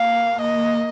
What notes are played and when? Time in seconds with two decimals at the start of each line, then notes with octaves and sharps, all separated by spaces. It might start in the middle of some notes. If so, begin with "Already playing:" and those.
Already playing: A#3 F5
0.41 D#5